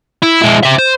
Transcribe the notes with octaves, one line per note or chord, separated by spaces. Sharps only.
E4
G#3 E4
C5 E5
C5